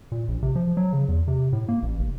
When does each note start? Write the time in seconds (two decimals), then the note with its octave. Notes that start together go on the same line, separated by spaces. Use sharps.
0.12 A#2
0.28 A#1
0.43 C3
0.56 F3
0.77 F#3
0.93 C#3
1.09 E2
1.28 C3
1.53 A2
1.68 A#3
1.83 A1
1.99 F1